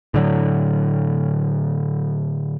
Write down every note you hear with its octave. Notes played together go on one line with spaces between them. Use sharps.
A2 D3 F#3